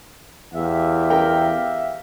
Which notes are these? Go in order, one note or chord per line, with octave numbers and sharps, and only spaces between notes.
E2 G4 E5 F5
A#4 G5